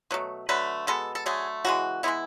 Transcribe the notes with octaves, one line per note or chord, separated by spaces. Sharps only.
B2 F#3 A3
D3 F#3 A3 B4
B2 G#3 B3 A4
A4
D3 F#3 A3 G#4
C#3 E3 G#3 F#4
E3 G#3 B3 E4